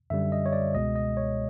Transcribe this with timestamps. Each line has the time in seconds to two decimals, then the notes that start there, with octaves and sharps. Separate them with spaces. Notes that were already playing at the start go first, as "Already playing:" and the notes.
0.10 F#2 D3 G3 E5
0.32 D#5
0.46 C#5
0.53 D5
0.75 C#2 B2 G#3 D#5
0.96 D#5
1.17 C#5